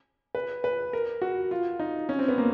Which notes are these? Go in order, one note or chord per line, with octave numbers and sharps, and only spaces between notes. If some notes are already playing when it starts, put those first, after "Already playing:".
B4
B4
A#4
F#4
F4
D#4
C#4
C4
B3
A#3